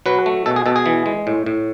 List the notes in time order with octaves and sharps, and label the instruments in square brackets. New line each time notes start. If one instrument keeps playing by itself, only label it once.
[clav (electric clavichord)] F#3 B4
A3
B2 A4
G#4
B2 A4
G#4
E3
G#3
A2
A2